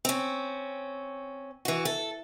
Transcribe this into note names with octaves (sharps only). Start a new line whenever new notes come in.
C4 C#4
E3 F#4
A4